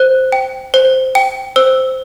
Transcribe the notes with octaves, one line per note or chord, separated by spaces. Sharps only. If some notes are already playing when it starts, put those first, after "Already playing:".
Already playing: C5 F#6
G5
C5
G5
C5 E6